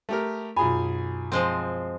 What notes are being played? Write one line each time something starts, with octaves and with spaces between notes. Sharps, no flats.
A3 G4 A#4
B1 F#2 F4 G#4 G#5 B5
F3 G#3 C4